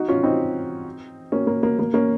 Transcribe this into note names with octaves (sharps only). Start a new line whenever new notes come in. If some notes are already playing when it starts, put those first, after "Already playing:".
Already playing: D#4 F#4
C#4 F4
C4 D#4
A#3 C#4
A#3
A#3
A#3
A#3 C#4